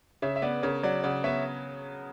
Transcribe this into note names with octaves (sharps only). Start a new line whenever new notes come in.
C#3 C#5 E5
E5
B3 B4 D5
C#3 A#4 C#5
F#3 D5 F#5
C#3 D5 F#5
B3 C#5 E5